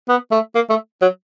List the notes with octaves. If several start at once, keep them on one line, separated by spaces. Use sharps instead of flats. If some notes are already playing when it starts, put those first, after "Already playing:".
B3
A3
A#3
A3
F#3